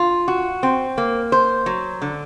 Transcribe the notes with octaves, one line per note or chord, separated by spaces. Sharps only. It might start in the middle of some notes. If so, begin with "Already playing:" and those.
Already playing: F4
F#4
C4
A#3
C5
F#3
D3